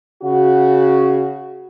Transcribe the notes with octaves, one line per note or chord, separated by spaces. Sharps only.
C#3 F#4